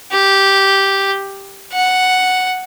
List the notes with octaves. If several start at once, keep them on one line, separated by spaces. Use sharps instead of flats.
G4
F#5